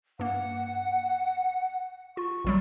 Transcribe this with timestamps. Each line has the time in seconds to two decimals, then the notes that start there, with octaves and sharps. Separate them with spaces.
0.19 G2 A#3 F#5
2.17 F4 C#6
2.45 G#1 F#3 G3